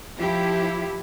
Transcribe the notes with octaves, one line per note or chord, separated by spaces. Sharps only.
F3 E4 G4